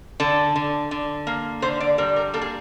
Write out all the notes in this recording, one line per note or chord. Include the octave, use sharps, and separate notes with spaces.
D3 A4
D3
D3
A#3
D3 C5
D5
G3 A#4
A#4
A#3 A4
G#4